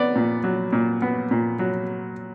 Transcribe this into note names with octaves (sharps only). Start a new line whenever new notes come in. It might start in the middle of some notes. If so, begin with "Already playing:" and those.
Already playing: B3 D5
A#2
F#3
A#2
B3
A#2
F#3